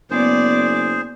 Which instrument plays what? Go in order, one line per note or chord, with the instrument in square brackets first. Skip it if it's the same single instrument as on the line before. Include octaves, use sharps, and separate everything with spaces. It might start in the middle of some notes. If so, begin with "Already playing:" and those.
[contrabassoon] F#1 [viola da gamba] B3 D5 [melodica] G#4 C5